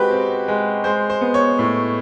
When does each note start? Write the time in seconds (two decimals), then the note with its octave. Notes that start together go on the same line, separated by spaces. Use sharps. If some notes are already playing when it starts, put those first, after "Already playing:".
Already playing: G#3 C4 F#4 G4 B4
0.11 C4
0.48 G#3
0.84 G#3 C5
1.10 C5
1.21 B3
1.34 C#5
1.59 A2